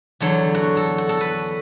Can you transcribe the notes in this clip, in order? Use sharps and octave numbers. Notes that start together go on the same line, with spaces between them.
E2 D3 F#3 A4
F#4
A4
F#4
A4
B4